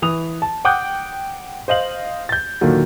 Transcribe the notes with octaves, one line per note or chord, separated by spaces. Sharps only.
E3 D#6 F7
A5
F#5 G5 D6 D#6 F#6 G6
C5 D#5 F5 F#7
G6 A6
D#2 A#2 D3 D#3 F#3